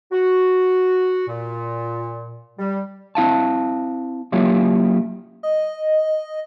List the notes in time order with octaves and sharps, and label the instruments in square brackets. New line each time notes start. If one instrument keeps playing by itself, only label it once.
[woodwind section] F#4
A#2
G3
[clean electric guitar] C4 E4 F5 A5
F#3 A#3 C#4 E4 F4 G4
[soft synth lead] D#5